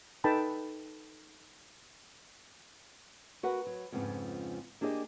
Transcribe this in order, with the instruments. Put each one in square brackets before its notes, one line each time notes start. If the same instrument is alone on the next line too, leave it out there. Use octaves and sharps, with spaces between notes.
[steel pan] D#4 A4 B4 G5 A5 B5
[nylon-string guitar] F#4 A#4 B4 F#5
F#3
F2 G#2 C#3 F3 B3
A#3 D4 G4 G#4 C5 D#5